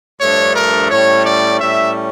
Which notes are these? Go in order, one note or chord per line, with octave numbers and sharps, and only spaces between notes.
G2 F3 A3 D4 C#5
A#4
A2 G3 C#4 C#5
D5
A2 G3 C#4 E5